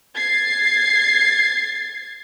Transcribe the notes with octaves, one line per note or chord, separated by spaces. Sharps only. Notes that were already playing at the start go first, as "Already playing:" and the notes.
G#6 A6 C7